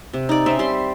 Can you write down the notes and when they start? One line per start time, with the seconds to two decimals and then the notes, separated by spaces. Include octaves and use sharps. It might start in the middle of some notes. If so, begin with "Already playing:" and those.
0.13 C3
0.29 D#4 D5
0.46 C4 C#4 E5
0.59 G3 C6